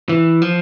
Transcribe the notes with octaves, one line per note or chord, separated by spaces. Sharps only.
E3
F3